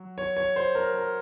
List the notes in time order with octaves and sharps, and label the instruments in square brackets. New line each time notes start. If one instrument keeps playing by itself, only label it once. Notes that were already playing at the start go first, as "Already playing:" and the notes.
Already playing: [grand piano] F#3
C#5
C#5
C5
A#4
A#4